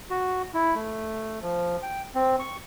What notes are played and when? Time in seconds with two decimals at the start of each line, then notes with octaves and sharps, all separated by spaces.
0.10 F#4
0.54 E4
0.75 A3
1.42 F3
1.82 G5
2.15 C4
2.39 C#6